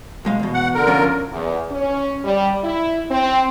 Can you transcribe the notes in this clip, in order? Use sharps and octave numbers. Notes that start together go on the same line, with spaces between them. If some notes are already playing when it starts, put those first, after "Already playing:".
B1 G#3 F5
E2 B2
F#5
D3 A#4
F3 C#4 F4
E2
C#4
G3
E4
C4